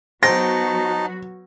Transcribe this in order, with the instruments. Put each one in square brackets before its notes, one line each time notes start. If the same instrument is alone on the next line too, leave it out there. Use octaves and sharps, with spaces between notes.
[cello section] F#3 B3 F#4 [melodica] D#4 A5 [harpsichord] C5 G5 [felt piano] A#6